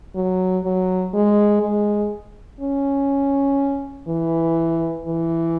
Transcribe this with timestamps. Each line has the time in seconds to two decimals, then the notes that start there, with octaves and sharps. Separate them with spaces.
0.15 F#3
0.64 F#3
1.14 G#3
1.62 G#3
2.61 C#4
4.08 E3
5.06 E3